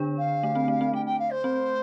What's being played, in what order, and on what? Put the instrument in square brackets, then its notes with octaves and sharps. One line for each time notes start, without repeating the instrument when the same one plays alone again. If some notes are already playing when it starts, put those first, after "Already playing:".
Already playing: [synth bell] D3 D4
[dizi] F5
[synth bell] A3
C4
A3
C4
[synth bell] A3 [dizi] G5
[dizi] G5
F5
C5
[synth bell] C4